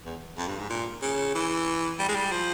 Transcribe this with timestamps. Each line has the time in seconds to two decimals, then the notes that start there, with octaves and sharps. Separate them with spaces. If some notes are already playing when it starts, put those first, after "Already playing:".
0.05 E2
0.38 F2
0.48 G2
0.59 G#2
0.70 A#2
1.02 C#3
1.35 E3
1.99 G3
2.09 G#3
2.15 G3
2.32 F3